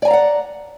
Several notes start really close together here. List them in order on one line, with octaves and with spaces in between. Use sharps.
D5 G#5 A#5 F5 F#5